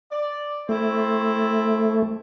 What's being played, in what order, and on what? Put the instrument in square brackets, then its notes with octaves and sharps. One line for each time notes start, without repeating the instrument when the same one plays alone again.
[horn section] D5
[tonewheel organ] A3 [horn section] C4 E4 C5